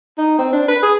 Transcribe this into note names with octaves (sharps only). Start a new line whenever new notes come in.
D#4
C4
D4
B4
G#4